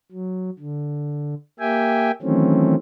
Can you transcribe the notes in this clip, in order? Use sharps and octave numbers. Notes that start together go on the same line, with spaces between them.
F#3
D3
A#3 G4 E5 G5 G#5
D#3 E3 F#3 A3 C4 C#4